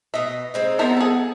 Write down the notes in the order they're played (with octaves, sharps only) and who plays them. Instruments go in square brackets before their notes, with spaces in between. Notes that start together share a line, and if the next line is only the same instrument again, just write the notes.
[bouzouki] B2 D#5 [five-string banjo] E5
[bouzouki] G#3 C4 D#4
[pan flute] B3 [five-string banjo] A#4 C5 E5
[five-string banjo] G#4 A4